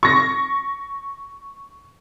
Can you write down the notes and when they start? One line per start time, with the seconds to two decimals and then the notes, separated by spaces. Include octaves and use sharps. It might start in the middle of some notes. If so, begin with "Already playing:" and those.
0.03 C#6 A#6